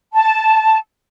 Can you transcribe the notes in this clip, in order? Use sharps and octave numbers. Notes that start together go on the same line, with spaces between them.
A5